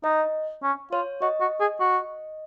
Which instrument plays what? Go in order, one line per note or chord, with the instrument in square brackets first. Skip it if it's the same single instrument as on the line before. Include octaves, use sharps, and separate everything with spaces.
[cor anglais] D#4 [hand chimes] D#5
[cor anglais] C#4
[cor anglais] F4 [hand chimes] C#5
[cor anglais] F#4 [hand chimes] D#5
[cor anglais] F#4
G#4
F#4